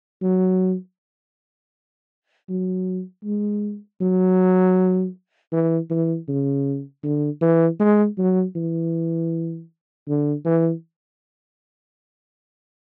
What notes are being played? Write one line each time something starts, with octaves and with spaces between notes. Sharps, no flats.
F#3
F#3
G#3
F#3
E3
E3
C#3
D3
E3
G#3
F#3
E3
D3
E3